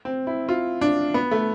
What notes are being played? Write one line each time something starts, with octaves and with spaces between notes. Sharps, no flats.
C4
E4
F4
D4
B3
A3